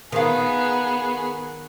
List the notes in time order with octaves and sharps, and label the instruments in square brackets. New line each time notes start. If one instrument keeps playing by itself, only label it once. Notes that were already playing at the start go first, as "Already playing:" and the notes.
[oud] D#3 F4 [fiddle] B3 G#4